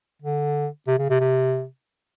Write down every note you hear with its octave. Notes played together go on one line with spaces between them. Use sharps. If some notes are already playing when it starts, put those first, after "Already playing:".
D3
C3
C#3
C3
C3